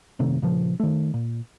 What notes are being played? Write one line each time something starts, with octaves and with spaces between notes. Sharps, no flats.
F#1 C3 D#3 A3
A#2 C#3 F3
D#3 A3
A#2